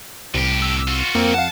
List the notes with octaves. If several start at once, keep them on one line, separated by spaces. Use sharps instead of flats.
C2 A2 G4
E6
F4 F#4
F2 A#3 C4 A#4
F5 F#5 A5